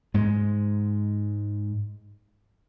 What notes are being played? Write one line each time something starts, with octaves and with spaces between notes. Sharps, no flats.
G#2 G#3